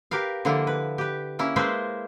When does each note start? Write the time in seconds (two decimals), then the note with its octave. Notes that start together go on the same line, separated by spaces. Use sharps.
0.11 G4 A#4 B4 F5
0.45 D3 F3 A#3 D4 E4
0.67 B4
0.98 G4 B4
1.39 A#3 C#4 E4
1.56 G#3 A#3 G#4 B4 C5 E5